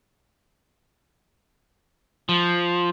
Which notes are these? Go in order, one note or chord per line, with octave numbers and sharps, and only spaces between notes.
F3